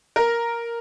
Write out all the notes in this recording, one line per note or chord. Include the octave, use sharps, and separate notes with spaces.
A#4